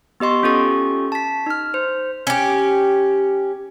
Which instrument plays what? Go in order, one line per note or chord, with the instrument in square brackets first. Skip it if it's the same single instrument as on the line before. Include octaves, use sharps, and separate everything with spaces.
[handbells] B3 G4 D#5 C6 C#6
C#4 F4 G4 A4 C#6
A5 B6
D#4 F6
C5
[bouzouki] C#4 G4